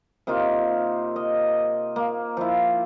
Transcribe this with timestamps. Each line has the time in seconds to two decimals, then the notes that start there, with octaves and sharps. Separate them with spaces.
0.27 C3 A#3 D#4 F4
1.16 D#5
1.96 A#3
2.37 F3 E4